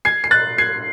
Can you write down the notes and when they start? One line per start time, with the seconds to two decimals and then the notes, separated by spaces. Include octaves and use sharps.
0.05 G#6 C7
0.24 C7
0.31 F#6 A6
0.58 G#6 C7